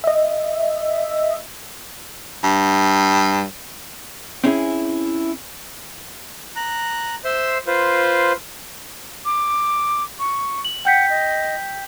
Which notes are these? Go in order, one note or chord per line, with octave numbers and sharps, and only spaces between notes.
D#5 E5
G2
C4 C#4 E4 G#4
A#5 F#6
C5 E5 C6
F4 B4 C5
D6
C#6
F#7
F#5 G5 G6 B6
D#5